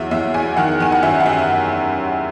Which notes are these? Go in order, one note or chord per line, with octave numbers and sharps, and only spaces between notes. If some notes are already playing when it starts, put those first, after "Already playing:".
Already playing: E2 F#3 E5
E2 E5
E2 G#5
D#3 F#5
D#3 G#5
F#5
F#2 E5
F#5
F#2 E5